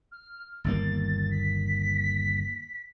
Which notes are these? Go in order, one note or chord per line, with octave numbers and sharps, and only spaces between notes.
F6
G1 D#2 A#3 A6
B6